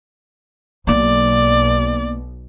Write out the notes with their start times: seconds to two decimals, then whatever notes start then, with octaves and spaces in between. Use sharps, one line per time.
0.87 B1 B2 A#3 B3 D5